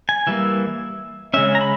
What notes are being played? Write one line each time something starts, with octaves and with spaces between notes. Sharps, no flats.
G#5
E3 G3 A#3 E5
C#3 G#3 C#4 E5
A#5
B5